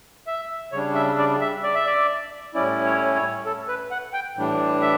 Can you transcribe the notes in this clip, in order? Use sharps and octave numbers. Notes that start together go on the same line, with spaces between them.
E5
C#3 G3 D4 C#5
E5
D5
E5
D5
E5
D5
A2 G3 C#4 E4 D5
C#5
C#5
A4
B4
F#5
G5
A2 E3 G3 D4
E5